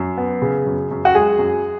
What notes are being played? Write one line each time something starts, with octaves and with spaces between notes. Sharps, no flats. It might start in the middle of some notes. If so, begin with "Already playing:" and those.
Already playing: F#2
B3
C#3
F#2
F#2
F#4
G#3 G#4
F#2